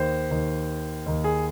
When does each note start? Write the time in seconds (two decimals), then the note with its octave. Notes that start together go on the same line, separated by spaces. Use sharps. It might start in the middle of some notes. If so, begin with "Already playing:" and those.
Already playing: D#2 D#3 C5
0.31 D#2 D#3
1.06 D#2 D#3
1.24 G#4